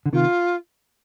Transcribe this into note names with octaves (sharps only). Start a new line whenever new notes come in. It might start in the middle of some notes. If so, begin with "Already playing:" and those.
D3
C3 D#3 F4